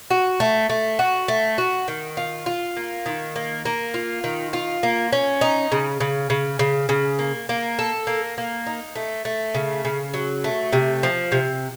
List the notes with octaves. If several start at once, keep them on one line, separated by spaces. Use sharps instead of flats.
F#4
A3
A3
F#4
A3
F#4
D#3
F4
F4
A#3
D#3
A#3
A#3
F4
D#3
F4
A#3
C#4
D#4
C#3
C#3
C#3
C#3
C#3
A#3
A#3
A4
A#3
A#3
D#4
A3
A3
C#3
C#3
F#3
A3
C3
F3
C3